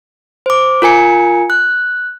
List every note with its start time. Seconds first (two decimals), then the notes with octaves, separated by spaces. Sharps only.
0.46 C5 D6
0.82 F4 A#4 G#5 C#7
1.50 F#6